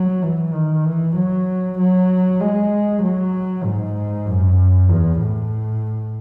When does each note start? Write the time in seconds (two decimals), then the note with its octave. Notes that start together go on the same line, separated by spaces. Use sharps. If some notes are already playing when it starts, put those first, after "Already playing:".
Already playing: F#3
0.23 E3
0.54 D#3
0.85 E3
1.16 F#3
1.79 F#3
2.40 G#3
3.03 F#3
3.64 G#2
4.26 F#2
4.89 E2
5.19 A2